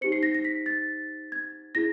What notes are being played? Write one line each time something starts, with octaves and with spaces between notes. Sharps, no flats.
D#4 G4 C5 C#7
C7
A#6
A#6
B6
A6
G#6
E4 G#4 A#6